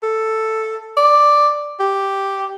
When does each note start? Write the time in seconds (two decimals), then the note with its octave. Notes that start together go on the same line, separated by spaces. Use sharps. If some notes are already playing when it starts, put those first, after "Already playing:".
0.03 A4
0.97 D5
1.80 G4